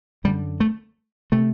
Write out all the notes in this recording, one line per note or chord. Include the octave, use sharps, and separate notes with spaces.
F#2 D3 G3
A3
C3 A3